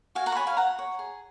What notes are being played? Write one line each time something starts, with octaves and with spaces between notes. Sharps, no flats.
F#4 F5 G#5
F#5 A#5
C#6
C#5 G#5 B5
F5 G#5
F#4 F#5 A#5
C#5
G#4